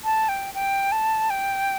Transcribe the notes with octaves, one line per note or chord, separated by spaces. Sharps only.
A5
G5
G5
A5
G5